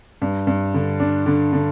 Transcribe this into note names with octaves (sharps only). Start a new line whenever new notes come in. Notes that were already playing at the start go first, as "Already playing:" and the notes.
G2
G2
D3
D4
D3
D3